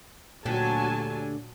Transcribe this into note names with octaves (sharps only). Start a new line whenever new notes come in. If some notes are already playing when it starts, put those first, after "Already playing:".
D2 A#2 D3 F#3 G4 G#5 A5